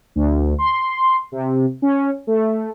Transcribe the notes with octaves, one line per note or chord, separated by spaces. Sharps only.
D2
C6
C3
C#4
A3